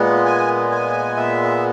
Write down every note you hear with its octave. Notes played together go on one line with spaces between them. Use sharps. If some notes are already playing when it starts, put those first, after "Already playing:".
Already playing: A#2 G#3 B3
G#5
G#5
E5